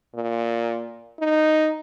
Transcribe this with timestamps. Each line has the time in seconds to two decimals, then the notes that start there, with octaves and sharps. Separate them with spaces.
0.15 A#2
1.19 D#4